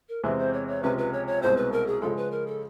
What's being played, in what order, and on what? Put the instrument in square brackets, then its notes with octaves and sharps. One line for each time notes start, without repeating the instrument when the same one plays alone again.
[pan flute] A#4
[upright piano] E2 C3 E3 G#3 C4 [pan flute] B4
[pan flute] C5
C#5
C#5
[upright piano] C#2 C3 F3 G#3 C#4 [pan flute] B4
[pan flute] B4
C#5
C#5
[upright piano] C2 B2 G#3 C4 [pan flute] C5
[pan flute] B4
A#4
G#4
[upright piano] C#3 F3 G#3 [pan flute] A4
[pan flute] B4
A#4
A4